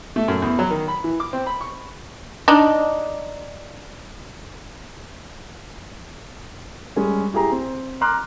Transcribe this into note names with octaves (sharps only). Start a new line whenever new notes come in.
A3
F#2
E2
F#3
D#3
B5
E3
D6
C4
B5
C#6
D4 D#4
G3 G#3 C#4 G#4
E4 G4 G#4 A#5
C4
A#5 C6 D6 F6 F#6